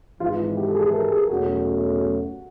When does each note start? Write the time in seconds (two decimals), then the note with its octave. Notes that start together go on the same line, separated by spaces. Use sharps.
0.20 G#1 G#2 E3 F4
0.57 G4
0.68 A4
0.75 G#4
0.86 A4
0.93 A#4
1.11 G#4
1.29 E2 B2 F#3 A3 C#4 F#4